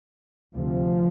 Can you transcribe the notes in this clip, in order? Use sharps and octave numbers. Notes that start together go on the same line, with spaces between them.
D2 C3 F3